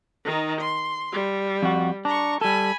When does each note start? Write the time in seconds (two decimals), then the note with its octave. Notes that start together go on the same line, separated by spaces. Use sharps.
0.25 D#3 D#4
0.61 C6
1.12 G3
1.63 F2 F#4
2.05 D4 A#5 C#6
2.41 G3 A4 G#5 B5